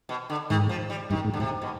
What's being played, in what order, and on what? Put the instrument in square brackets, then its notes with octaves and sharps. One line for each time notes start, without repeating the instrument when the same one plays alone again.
[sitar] B2
D3
[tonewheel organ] G#2 [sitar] D#3
[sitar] F3
G3
[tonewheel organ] G2 [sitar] D#3
[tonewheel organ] G#2
[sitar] D3
[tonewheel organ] G#2 [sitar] C3
[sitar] B2